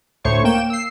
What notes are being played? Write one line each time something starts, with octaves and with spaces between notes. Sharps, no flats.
D2 A2 C5 C#5 C#6
A#3 G5 E7
E6 C7